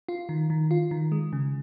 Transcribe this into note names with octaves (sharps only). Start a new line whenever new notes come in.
F4
D#3
D#3
F4
D#3
G#3
C#3